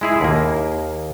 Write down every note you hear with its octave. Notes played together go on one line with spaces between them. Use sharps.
G#3 E4 G#4
D#2 A#3